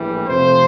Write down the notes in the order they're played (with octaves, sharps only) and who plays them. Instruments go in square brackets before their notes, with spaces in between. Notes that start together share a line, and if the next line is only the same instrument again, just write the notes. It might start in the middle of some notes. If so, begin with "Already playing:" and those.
Already playing: [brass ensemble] A#1 A2 E3 G3
F2 C3 F3 A3 C5